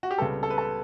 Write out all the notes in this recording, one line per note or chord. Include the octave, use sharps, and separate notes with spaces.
F#4
G4
C#2 C#3 G3 B3 A4
A4
B4
A4